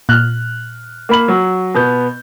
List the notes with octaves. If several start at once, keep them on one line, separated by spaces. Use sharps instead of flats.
A#2 F6 F#6
A#3 B5 F#7
F#3
B2 B3 G6